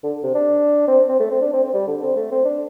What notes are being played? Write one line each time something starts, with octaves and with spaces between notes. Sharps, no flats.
D3
C3
D4
C4
C4
A3
C4
D4
C4
C4
G3
D3
C4
A3
C4
D4